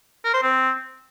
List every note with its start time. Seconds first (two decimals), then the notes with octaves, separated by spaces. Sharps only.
0.25 A#4
0.34 C5
0.43 C4